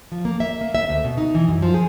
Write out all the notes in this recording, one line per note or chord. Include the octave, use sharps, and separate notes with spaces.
F3
A#3
E5
A#3
E5
D2
B2
D#4
E3
F#2
F3
G#4